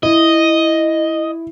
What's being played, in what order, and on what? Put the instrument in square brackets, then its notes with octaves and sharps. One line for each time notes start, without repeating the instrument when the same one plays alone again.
[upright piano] E4 [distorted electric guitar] D#5